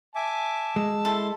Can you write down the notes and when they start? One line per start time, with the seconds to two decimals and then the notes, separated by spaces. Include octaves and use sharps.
0.16 E5 G#5 A5 D6
0.76 G#3 E6
1.05 E4 A4 C6